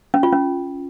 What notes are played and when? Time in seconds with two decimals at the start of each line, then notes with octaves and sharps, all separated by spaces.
0.14 C#4
0.23 F4
0.33 C#4